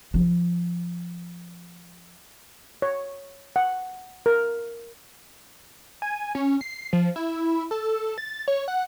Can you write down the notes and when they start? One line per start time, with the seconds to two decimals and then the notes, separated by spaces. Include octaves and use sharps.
0.14 F3 F4
2.82 C#5
3.56 F#5
4.26 A#4
6.02 G#5
6.35 C#4
6.61 C7
6.93 F3
7.16 E4
7.71 A4
8.18 A6
8.48 C#5
8.68 F#5